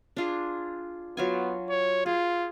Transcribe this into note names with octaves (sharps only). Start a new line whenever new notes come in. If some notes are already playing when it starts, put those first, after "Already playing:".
D4 F4 G#4
F#3 B3 F4 G#5
C#5
F4 G#4